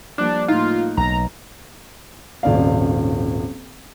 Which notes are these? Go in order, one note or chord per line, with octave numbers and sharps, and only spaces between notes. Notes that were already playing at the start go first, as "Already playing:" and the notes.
F3 G3 A#3 D4 F#6
A2 A#3 D#4 F4
B1 A#5
D#1 G#1 C#3 D5 F5